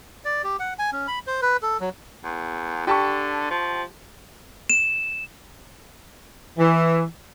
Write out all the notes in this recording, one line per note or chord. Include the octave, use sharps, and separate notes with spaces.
D5
G4
F#5
G#5
C#4
B5
C5
B4
A4
F#3
E2
D3 G4 A5 C#6
F3
E7
E3